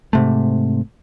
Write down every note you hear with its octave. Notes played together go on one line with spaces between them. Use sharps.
G#2 C3 A3